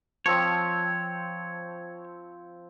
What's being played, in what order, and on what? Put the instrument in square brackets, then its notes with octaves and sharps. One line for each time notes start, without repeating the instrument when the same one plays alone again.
[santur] F3 C4 [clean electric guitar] C#5